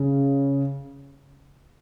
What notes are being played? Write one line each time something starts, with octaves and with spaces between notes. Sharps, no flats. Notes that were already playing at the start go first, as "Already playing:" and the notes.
Already playing: C#3